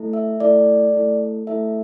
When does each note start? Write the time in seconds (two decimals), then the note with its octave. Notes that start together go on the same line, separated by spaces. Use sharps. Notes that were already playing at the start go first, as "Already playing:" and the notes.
Already playing: A3 E4 A4
0.13 E5
0.40 A3 E4 A4 D5
0.93 A3 E4 A4
1.47 A3 E4 A4 E5